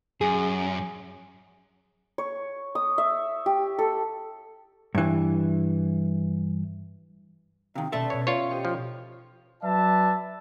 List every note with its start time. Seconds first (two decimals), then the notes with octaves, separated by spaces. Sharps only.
0.21 F#2 G#4
2.18 C#5
2.75 D#6
2.98 E5
3.46 G4
3.79 A4
4.95 G2 E3
7.75 C3 D#3 D#5 F5 G5
7.92 B2 C#4 A4 B4 D5 E5 C6
8.10 B2 C#5 G#6
8.27 F4 C#5
8.50 G4 C5 D#5 G5 C#6
8.65 F3 F4 C#5
9.63 F#3 B4 D5 E5 A5